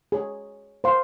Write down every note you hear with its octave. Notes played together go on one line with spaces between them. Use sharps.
G#4 C#5 G#5
C5 F5 C6